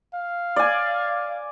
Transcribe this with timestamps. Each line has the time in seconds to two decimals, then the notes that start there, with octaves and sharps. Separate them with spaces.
0.14 F5
0.56 D5 G#5